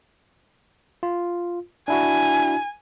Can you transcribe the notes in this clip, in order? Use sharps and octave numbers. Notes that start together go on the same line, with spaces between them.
F4
D4 E4 F#4 G#5